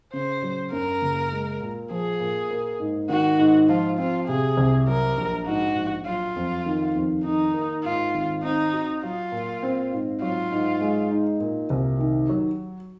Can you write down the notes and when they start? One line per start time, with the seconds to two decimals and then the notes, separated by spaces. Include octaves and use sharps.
0.13 C#3 C5
0.42 F#3
0.72 F#2 A#4
1.02 F#1
1.31 G#3
1.61 A#2
1.90 F3 G#4
2.20 A#2
2.51 A#3
2.80 G#2
3.09 D#3 F#4
3.39 G#2
3.69 F3 F4
3.98 C4 F4
4.28 C3 G#4
4.57 C2
4.87 F#3 A#4
5.17 A#1
5.47 G#2 F#4
5.76 A#1
6.06 F#3 F4
6.36 F2
6.66 D#3
6.95 F2
7.25 D#3 D#4
7.54 A#3
7.84 G#2 F4
8.14 G#1
8.43 C4 D#4
8.73 F#4
9.03 F#3 F4
9.32 A#2
9.63 C4
9.92 G#2
10.22 F#3 F4
10.51 G#2
10.81 G#3
11.11 D#4
11.40 A#2
11.70 C2
11.99 D#3
12.29 F#3